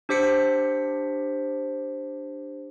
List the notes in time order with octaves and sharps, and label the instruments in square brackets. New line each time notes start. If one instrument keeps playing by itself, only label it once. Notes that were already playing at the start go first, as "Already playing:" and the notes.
[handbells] D4 G4 C5 B6 C#7